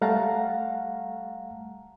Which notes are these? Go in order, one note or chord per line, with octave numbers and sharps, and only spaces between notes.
G3 A3 F5 F#5 A5 A#5